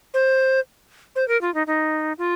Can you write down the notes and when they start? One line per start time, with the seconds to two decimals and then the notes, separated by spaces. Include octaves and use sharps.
0.14 C5
1.16 C5
1.28 A#4
1.41 F4
1.54 D#4
1.67 D#4
2.18 F4